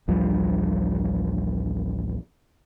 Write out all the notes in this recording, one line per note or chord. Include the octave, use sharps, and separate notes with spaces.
A1 D2 F3 G3